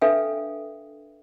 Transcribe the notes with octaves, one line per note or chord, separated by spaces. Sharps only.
D4 A4 B4 E5 F5 G5